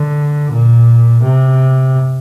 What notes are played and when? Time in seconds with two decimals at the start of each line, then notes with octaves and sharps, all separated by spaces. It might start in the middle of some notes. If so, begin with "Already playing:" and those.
Already playing: D3
0.53 A#2
1.23 C3